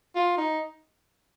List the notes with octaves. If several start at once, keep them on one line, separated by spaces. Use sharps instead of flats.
F4
D#4